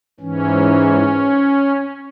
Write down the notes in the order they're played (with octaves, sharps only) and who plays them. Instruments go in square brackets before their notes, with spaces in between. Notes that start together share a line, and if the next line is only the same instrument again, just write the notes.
[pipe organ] G#2 E3 C#4